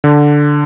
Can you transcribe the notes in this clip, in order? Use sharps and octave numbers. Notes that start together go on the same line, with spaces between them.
D3